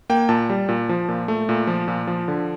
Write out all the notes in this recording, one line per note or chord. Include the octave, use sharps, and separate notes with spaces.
A#3 G5
A#2 A5
G3
A#2
F3
A#2
A3
A#2
F3
A#2
F3
D3